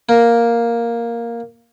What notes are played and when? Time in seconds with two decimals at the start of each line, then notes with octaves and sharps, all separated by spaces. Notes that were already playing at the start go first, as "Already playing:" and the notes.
0.09 A#3